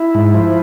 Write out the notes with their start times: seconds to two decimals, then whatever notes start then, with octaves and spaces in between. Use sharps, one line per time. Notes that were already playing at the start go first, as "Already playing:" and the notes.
Already playing: E4
0.14 G#2
0.34 F3